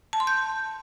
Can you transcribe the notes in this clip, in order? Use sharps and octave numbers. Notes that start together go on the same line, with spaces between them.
A5
C6
G6